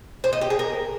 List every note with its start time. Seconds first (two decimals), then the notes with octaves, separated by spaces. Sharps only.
0.24 C5
0.33 D#5
0.41 G4
0.50 G#4
0.59 A#4